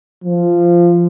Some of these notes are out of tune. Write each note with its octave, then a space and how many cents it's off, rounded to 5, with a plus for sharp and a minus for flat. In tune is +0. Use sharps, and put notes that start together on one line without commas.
F3 -10